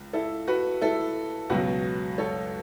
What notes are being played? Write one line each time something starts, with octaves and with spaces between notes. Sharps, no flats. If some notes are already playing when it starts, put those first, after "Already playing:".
Already playing: C#2
E4 A4
F#4 B4
E4 A4
C#2 B2 F#3 F#4 B4
A4 C#5